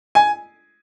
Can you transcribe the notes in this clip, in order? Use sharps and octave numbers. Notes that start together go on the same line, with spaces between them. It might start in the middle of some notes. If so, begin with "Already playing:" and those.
G#5